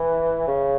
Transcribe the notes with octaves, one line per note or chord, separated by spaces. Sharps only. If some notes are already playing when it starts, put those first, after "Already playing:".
Already playing: E3
C#3